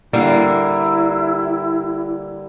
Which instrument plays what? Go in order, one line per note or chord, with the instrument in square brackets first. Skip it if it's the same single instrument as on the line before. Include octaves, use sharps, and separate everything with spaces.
[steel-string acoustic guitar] D3 G3 A#3 [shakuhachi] E4